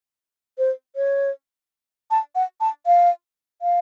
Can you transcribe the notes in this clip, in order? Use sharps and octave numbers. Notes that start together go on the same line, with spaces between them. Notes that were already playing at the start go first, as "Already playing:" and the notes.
C5
C#5
A5
F#5
A5
F5
F5